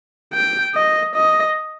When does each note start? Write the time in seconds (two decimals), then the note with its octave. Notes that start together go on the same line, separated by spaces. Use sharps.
0.33 G5
0.75 D#5
1.15 D#5